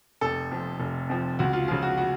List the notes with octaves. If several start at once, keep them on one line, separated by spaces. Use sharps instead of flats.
F1 A4
F2 F3
F1
F2 F3
C#2 F#4
F4
C#3 F3 F4
F#4
F#4